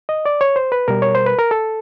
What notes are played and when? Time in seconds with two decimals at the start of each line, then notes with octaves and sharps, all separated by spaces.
0.09 D#5
0.26 D5
0.41 C#5
0.56 C5
0.72 B4
0.88 B2 G3 A#4
1.02 C#5
1.15 C5
1.26 B4
1.39 A#4
1.51 A4